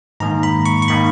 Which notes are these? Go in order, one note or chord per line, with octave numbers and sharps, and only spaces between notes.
G#2 D#3 A#3 A#5
B5
C#6
C#6
D#3 A#3 B5